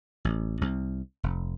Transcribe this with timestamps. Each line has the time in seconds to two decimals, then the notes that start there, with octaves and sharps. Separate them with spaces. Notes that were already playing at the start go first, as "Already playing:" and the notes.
0.25 A1
0.61 C2
1.23 F1